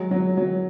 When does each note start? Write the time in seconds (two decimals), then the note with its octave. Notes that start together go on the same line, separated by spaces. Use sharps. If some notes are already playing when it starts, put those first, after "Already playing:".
Already playing: F#3 G#3
0.11 F#3
0.37 F#3